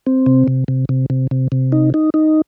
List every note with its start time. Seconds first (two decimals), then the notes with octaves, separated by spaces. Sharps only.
0.07 C4
0.26 C3
0.48 C3
0.68 C3
0.89 C3
1.10 C3
1.31 C3
1.52 C3
1.72 D#4
1.94 D#4
2.14 D#4